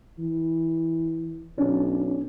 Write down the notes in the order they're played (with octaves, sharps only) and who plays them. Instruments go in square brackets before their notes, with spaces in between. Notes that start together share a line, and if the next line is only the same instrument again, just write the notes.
[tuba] E3
[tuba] B1 [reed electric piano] C#4 D4